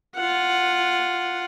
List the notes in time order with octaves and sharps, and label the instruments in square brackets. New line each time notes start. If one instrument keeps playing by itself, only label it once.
[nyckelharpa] F4 F#5